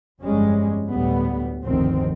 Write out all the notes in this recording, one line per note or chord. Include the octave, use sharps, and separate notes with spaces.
G1 F2 G3 G#3 C#4
D2 A2 G3 B3
F1 D2 G2 D#3 C4